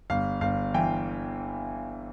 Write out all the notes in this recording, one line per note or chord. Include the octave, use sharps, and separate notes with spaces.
G1 F5
G1 F5
E3 G5